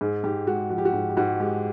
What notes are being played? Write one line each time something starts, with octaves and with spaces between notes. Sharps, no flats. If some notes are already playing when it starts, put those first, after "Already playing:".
G#2 G#4
G#2 G4
G#3 F#4
F3 F#4
G4
F#4
G#2
G4
G#2 F#4
G#3 G4